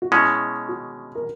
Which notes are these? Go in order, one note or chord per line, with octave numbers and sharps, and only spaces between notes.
F#4
B2 G#3 C#4 E4
F#4
A#4